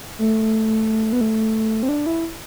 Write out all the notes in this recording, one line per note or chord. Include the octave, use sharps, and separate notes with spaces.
A3
B3
A3
C4
D4
E4